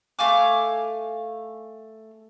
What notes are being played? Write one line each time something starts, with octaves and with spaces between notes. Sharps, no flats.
A3 F5 G#5 D6